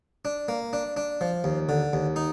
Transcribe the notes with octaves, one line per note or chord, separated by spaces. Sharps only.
D4
A#3
D4
D4
F3
D#2
D3
D#2
D#4